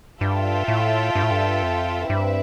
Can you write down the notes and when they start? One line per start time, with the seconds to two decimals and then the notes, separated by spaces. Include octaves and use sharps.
0.21 G2 F4 A4 E5 G5
0.68 A2
1.15 G2
1.23 A2
1.31 G2
1.63 F2
2.10 G2 C4 E4 B4 E5